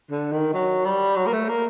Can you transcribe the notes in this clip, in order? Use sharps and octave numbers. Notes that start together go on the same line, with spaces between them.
D3
D#3
F#3
G3
F#3
A#3
A3
A#3